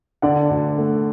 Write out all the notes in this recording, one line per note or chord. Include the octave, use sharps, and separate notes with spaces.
D3 D5 F#5
D2
A3